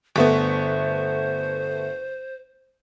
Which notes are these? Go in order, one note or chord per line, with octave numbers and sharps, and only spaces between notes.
G1 A3 B3 C5